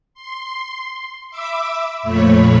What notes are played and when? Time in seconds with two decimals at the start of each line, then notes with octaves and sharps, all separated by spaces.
0.14 C6
1.31 E5 B5 D6 E6
2.03 F2 A#2 A3 C#5 B5